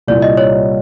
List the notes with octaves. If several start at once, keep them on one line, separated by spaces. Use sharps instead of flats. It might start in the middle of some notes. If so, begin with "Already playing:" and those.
C2 A#2 G3 D5
D#5
C#5